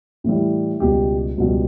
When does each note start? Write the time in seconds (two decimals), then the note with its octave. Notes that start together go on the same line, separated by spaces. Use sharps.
0.24 A2 E3 G3
0.80 C#2 B2 G3 G4
1.38 C#2 B2 G3